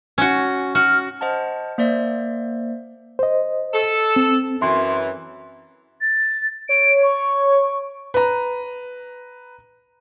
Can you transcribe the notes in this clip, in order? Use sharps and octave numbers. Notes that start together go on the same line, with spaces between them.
C#4 F#4
F#4 F6
C5 D#5 F#5 A5
A#3 C5 D5 E5
C5 D#5
A4
C4
F#2 E3 C6
A6
C#5 D7
C#6
B4 A#5